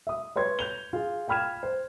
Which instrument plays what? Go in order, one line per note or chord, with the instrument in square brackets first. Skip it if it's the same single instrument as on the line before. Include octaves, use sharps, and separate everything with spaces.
[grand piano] E5 D#6
B4 C#5 C6 G#6
G6 F7 G7
F4 G#4
F5 G5 B5 F6 G#6 E7
C5